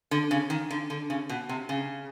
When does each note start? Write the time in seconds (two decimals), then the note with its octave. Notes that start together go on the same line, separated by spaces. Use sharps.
0.11 D3
0.31 C#3
0.50 D#3
0.71 D3
0.90 D3
1.10 C#3
1.29 B2
1.49 C3
1.69 C#3